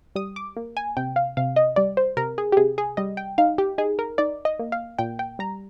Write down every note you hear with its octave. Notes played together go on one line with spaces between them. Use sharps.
G3 D#6
D6
A#3
G#5
C3 G5
F5
C3 F5
D#5
G3 D5
C5
C3 A#4
G#4
G4
C3 G#4
G#4
G3 D#5
G5
D#4 F5
G4
D#4 G#4
A#4
D#4 D5
D#5
A#3
F5
A#2 G5
G5
G3 A#5